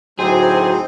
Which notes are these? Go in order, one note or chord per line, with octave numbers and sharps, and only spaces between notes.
D2 A2 F#3 C4 D#4 G#4 C5